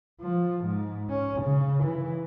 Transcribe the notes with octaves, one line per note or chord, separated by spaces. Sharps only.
F3
G#2
C#4
C#3
E3